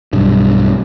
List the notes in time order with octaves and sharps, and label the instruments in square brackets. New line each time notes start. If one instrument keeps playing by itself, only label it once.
[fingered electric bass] B1 G2